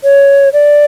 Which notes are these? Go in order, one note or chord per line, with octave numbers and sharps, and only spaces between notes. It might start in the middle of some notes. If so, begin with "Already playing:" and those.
C#5
D5